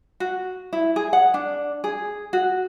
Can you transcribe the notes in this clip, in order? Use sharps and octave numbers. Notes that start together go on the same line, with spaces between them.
F#4
E4
G#4
F#5
D4
G#4
F#4